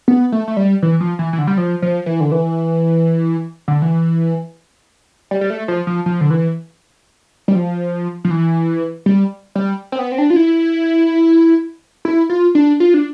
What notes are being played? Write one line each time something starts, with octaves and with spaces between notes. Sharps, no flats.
B3
A3
A3
G3
E3
F3
E3
E3
D3
G3
F3
F3
E3
D3
E3
D3
E3
G3
G3
A3
F3
F3
F3
D3
E3
G3
F3
F3
E3
G3
G3
C4
B3
C4
D4
F4
E4
E4
F4
D4
F4
D4